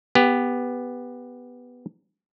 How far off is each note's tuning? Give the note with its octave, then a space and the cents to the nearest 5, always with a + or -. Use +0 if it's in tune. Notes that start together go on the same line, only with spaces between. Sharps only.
B3 +0 G4 +20